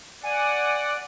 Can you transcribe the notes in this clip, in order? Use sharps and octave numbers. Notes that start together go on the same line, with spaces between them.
D5 F#5 G#5